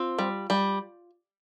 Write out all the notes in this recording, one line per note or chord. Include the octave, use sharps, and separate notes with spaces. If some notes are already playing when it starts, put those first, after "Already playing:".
Already playing: C4 F4
G3
G3